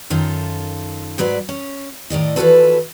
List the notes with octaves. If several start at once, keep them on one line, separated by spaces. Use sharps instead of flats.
F#2 D#3 F4 A4
G#2 F#3 B4 D5
C#4
A2 D#3 D5 D#5
E3 F3 G3 F#4 A4 B4